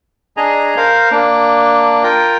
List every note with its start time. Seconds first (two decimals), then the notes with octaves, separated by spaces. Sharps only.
0.37 D4 G#4 D#5 G#5 A#5
0.77 A#4 C5 F5
1.11 A#3 D4 D6
2.03 F4 A#4 G5